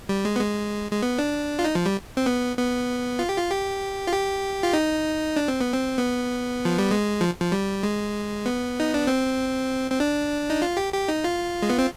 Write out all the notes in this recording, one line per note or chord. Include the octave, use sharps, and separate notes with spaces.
G3
G#3
B3
G#3
G#3
B3
D4
F4
D#4
F3
G3
C4
B3
B3
F4
G4
F4
G4
F4
G4
F4
D#4
D4
C4
B3
C4
B3
F3
G3
G#3
F3
F3
G3
G#3
B3
D#4
D4
C4
C4
D4
D#4
F4
G4
G4
D#4
F4
G#3
B3
C4